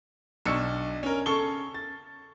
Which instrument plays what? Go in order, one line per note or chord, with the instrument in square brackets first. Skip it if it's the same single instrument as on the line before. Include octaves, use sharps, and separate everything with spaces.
[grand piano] B1 D4 C#6 E6 C#7
C#4 A#4
C#3 A4 C#6 G7
A6